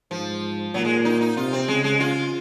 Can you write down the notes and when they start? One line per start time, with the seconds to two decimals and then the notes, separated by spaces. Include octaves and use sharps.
0.11 G#2 F3
0.74 A#2 F#3
0.85 G#3
1.05 D#4
1.21 D#4
1.37 C3 F4
1.53 C4
1.68 C#3 G#3
1.84 G#3
2.00 F4